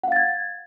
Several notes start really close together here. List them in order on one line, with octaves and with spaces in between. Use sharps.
F#5 F5 A6 G#6